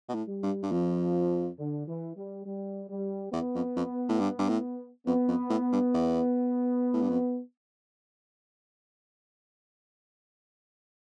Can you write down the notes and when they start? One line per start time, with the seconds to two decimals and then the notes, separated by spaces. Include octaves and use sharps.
0.09 B2
0.14 A2
0.28 G3
0.43 G2
0.63 G2
0.72 F2 F3
1.59 D3
1.88 E3
2.17 G3
2.46 G3
2.89 G3
3.33 E2 B3
3.55 F2
3.76 F2
4.09 A2
4.20 G2
4.39 G2
4.49 A2
5.07 F2 B3
5.29 F2
5.50 A2
5.72 G2
5.94 E2
6.94 A2
7.02 G2
7.09 F2